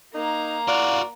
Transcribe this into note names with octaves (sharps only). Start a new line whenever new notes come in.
A#3 D#4 A#5
F4 F#4 D5